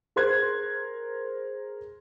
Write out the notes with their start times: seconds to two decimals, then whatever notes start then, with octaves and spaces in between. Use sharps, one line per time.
0.16 G#4 A#4 C5 C6 F#6 G#6